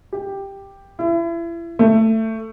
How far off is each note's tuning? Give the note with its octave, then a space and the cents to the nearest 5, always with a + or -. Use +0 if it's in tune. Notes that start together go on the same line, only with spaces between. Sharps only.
G4 +5
E4 +35
A3 +15